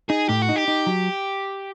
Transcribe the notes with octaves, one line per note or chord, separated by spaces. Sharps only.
D#4 G#4
A2 G4
F#4
D#4
G4
D#4
F#3